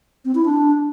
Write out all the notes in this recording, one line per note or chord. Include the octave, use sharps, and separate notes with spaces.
C4
E4
D4